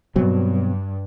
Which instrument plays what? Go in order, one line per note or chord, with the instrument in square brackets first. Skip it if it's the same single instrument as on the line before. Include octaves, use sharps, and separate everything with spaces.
[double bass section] G2 [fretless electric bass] B2 F#3 C4